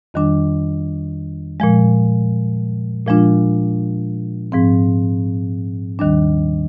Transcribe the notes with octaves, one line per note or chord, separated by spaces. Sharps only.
F2 D#3 G3 D4
A#2 F3 G#3
A#2 F3 G#3 D4 F4
G#2 F3 C4
D#2 D#3 G3 D4